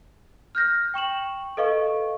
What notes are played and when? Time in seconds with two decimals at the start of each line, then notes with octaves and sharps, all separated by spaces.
0.55 F6 G6 A#6
0.94 G5 C#6 E7 F#7
1.57 A4 B4 D#5 F5 C#6